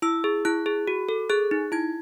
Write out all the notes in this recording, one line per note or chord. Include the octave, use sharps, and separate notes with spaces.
E4 E6
G#4
E4 F#6
G#4
F#4
A4
G#4 F#6
D#4
E4 G#6